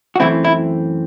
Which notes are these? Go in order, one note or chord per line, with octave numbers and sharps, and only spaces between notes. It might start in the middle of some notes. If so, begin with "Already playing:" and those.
F#4
F#2 E3 A3 C4 E4
E4